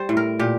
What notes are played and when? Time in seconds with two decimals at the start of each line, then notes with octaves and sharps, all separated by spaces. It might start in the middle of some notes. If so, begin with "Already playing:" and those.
Already playing: G3 C5
0.09 A2
0.17 A#4
0.39 A#2 G4